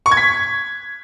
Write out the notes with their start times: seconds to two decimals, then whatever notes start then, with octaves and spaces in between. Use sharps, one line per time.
0.06 C#6
0.11 G#6
0.17 B6